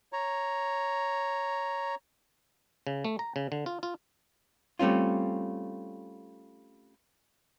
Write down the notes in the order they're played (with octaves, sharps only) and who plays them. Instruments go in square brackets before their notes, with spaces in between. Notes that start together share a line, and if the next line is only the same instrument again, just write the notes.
[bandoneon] C#5 A#5
[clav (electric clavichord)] C#3
A3
A#5
C#3
D3
F4
F4
[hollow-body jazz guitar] G3 A3 C4 C#4 F4